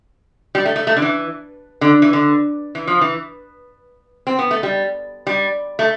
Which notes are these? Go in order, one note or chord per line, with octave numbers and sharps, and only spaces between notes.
G3
A3
A3
A3
D3
E3
D3
E3
D3
E3
F3
E3
C4
B3
A3
G3
G3
A3